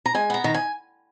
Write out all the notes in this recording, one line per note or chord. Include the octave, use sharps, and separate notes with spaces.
A#5
G#3 G#5
B3 A#5
D#3 A#5
G#5